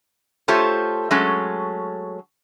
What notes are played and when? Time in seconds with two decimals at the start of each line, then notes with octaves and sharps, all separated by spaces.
0.48 A3 F4 G4 A4 C5 C#5
1.11 F#3 G#3 A3 C#4 A4